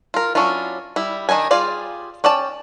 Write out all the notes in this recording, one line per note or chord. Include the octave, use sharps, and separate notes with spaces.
F4 A#4
F#3 C#4 D4 E4 F4
G3 E4
D#3 D4 D#4 G#5
G3 F4 G#4 D5 F5
C#4 D5 G5 A5